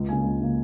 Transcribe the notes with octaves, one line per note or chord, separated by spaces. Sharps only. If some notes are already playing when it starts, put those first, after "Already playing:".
Already playing: C#2
C#3 A#3 G#5
C#2
C#3 A#3